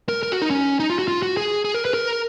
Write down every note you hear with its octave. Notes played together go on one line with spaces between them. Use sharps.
A#4
A#4
F#4
D#4
C#4
D#4
F4
F#4
F4
F#4
G#4
G#4
A#4
B4
A#4